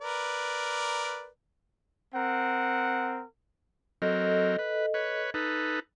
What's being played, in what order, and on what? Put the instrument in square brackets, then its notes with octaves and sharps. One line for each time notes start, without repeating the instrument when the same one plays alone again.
[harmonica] A#4 B4 D5
[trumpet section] C4 A#4 F#5
[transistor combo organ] F#3 C4 A#4 [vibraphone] A4 D#5
[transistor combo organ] B4
B4 C#5
D#4 A4 B4